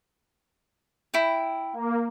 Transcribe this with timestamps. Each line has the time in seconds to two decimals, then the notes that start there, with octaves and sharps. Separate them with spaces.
1.14 E4 G5
1.73 A#3